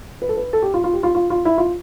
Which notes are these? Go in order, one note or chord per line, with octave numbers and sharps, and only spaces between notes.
B4
A4
B4
A4
G4
F4
F4
G4
F4
F4
F4
E4
F4